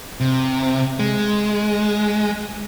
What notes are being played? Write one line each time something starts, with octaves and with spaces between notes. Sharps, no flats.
C3
G#3